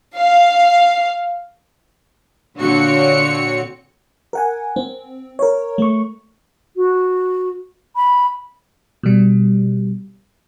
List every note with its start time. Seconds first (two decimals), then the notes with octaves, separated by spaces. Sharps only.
0.17 F5
2.60 A#2 D3 C4 F#4 C#5 C#7
4.33 A#4 F#5 G#5
4.76 C4
5.39 A#4 C#5
5.78 A3 C#6
6.76 F#4
7.96 B5
9.03 B2 G3